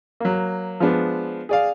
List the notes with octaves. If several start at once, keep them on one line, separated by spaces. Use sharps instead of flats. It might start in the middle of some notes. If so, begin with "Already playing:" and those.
F#3 A#3
F3 G#3 B3 D4
G#4 D5 F5